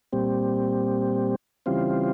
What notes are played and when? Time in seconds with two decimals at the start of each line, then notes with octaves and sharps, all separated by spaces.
0.12 A#2 G3 C4
1.66 C#3 E3 G3 C4 F4